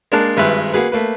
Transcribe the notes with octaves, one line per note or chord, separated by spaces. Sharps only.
G#3 A#3 D4 A#4 A5 F#6
G#1 G2 G#3 B4 E5 F#6
A#3 F#4 G#4 B4
A3 A#3 B4